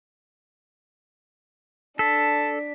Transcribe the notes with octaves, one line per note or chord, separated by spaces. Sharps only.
D4 A4 A5 B6